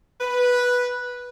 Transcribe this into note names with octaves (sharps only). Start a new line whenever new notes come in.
B4